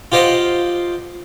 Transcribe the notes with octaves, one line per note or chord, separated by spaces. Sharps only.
F4 G4 C5 D#5 F#5